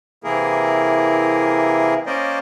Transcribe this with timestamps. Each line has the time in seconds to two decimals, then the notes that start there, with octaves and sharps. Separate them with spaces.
0.24 C3 E3 A#3 E4 G#4 A#4
2.06 A#3 C#4 A#4 C5 D5 D#5